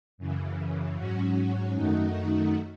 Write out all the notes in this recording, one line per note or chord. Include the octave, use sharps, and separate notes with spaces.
F#2 C#3 E3
G#2 F#3 C#4 F#4
F#2 D#3 A3 D#4 F#4